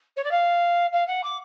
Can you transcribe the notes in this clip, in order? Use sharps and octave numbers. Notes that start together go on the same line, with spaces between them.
C#5
D5
F5
F5
F#5
D6